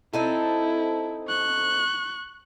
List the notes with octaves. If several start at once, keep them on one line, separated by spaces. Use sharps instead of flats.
C4 D#4 E4 A4
C#6 F#6